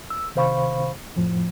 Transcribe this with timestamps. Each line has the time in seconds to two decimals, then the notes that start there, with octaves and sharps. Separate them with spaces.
0.10 E6
0.36 C3 D#3 C5 F5 B5 C#6
1.16 F2 A2 F3